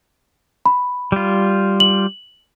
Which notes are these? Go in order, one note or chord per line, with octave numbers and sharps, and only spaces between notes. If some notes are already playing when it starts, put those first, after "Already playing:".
B5
G3 F4
F#7